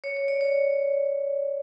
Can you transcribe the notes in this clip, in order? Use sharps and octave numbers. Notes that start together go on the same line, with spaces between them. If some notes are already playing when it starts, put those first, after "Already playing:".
C#5
C#5
D5
C#5